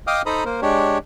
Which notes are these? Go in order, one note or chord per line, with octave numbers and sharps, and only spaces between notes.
D#5 F5 G5 D6 D#6 F6
D#4 A4 C5 A#5 B5 D#6
A#3 A#4 C5
G#3 D4 G4 C#5